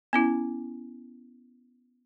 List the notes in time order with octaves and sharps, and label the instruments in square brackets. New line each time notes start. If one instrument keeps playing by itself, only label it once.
[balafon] B3 C#4 E4